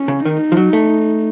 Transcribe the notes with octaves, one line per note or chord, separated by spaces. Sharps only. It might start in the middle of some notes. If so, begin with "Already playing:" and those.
Already playing: C#4
C#3
D#3 D#4
F3
F#3
A3